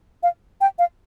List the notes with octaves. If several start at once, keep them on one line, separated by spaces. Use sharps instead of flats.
F5
G5
F5